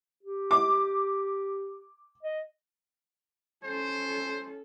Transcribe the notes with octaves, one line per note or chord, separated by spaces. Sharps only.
G4
D6
D#5
C#4 A4 C5